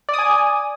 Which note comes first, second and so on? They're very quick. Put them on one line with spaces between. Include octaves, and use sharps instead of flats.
D5 D#6 G#5